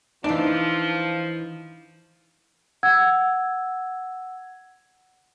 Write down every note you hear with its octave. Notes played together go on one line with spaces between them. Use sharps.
E3 F3 D4 D#4
F#5 E6 G#6